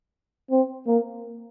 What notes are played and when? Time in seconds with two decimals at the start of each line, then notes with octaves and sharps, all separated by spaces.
0.51 C4
0.87 A#3